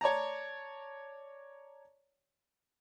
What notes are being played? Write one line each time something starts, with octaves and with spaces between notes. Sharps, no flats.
C#5 D5 A5 A#5